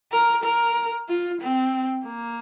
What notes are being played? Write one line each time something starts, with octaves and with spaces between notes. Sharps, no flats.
A#4
A#4
F4
C4
A#3